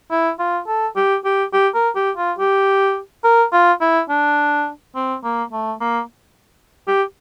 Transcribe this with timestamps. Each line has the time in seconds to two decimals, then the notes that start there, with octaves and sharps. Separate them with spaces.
0.11 E4
0.39 F4
0.67 A4
0.96 G4
1.25 G4
1.53 G4
1.75 A#4
1.96 G4
2.17 F4
2.39 G4
3.24 A#4
3.53 F4
3.81 E4
4.09 D4
4.96 C4
5.24 A#3
5.53 A3
5.80 A#3
6.88 G4